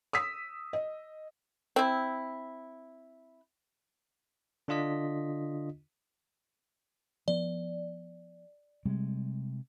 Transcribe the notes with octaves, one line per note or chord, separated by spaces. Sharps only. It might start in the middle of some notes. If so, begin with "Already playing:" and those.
D#6 E6 B6
D#5
C4 E4
D3 D4 F4 D#5 B6
F3 B3 D5
C3 G3 G#3